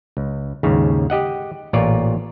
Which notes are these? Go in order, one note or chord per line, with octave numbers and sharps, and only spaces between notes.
C#2
D#2 G#2 C#3
G4 D#5 F#5
A1 A#2 F4 C#5 D5